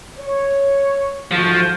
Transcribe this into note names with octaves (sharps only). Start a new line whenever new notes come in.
C#5
G#2 F3 A3 F#4